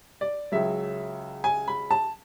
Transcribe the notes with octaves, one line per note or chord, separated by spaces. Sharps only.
D5
C#2 C#3 F#3 E5
G#5
B5
A5